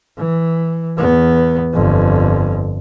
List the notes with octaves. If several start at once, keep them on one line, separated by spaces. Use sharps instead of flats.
E3
E2 B3
G1 F2